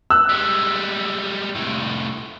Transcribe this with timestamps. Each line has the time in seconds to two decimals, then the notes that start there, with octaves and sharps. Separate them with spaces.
0.10 E6 F#6
0.29 G3 G#3
1.55 C2 A2